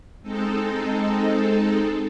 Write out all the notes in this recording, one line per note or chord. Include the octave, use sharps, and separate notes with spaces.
G#3 C4 D#4 A4